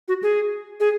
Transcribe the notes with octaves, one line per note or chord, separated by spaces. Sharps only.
F#4
G#4
G#4